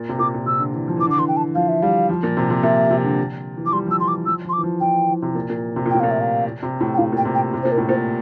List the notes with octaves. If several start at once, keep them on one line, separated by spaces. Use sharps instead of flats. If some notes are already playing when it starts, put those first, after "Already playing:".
Already playing: A#2
C3
A#2 D6
A#2
C3 E6
D3
E3
F3
E3 D6
D3 D6
E3 C6
G5
A5
F3 F5
E5
G3 F5
F3
A#2
C3
C3
A#2 E5
C3
D3
E3
F3 D6
G3 C6
F3
E6
E3 C6
D6
E3
F3 E6
F3 C6
D6
E3
F3
F3 G5
E3
E3
C3
A#2
A#2
C3
A#2
A2 G5
A#2 F5
E5
F5
C3
A2
G5
A2 F5
A#2
G5
C3
G5
C3
A#2 C5
A#4
A2
A#2 C5